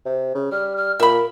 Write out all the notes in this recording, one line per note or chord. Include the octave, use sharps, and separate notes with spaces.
C3
C#3
G3 F6
F6
A#2 A#4 E5 B5